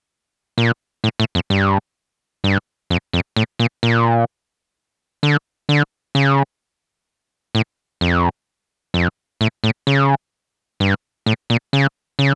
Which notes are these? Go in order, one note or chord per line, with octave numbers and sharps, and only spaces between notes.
A#2
A2
A2
F2
G2
G2
F2
F2
A2
A#2
A#2
D3
D3
C#3
A2
F2
F2
A2
A2
C#3
G2
A2
A#2
C#3
C#3